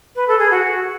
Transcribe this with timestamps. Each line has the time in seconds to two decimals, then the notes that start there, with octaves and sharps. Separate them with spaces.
0.15 B4
0.27 A4
0.38 G#4
0.50 F#4